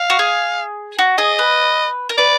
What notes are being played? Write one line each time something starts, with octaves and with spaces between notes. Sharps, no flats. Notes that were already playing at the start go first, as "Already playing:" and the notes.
Already playing: F5
F#4
G#4
F#4
G#4 D#5
B4
A#4
B4 D5